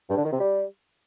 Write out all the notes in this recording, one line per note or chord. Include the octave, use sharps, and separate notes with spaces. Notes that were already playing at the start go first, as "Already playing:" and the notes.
G2
D3
D#3
C3
G3